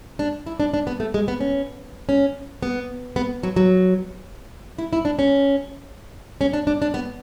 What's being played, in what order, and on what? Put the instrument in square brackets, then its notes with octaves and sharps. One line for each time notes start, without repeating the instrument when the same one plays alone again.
[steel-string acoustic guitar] D4
E4
D4
D4
B3
A3
G#3
B3
C#4
C#4
B3
B3
F#3
F#3
E4
E4
D4
C#4
C#4
D4
D4
D4
B3